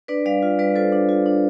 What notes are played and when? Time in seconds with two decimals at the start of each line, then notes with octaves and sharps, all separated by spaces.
0.08 D4 B4 D5
0.26 G3 D5 F5
0.42 F4
0.59 G3 B4 D5
0.75 F4 A4 C5
0.92 D4
1.09 F4
1.26 D4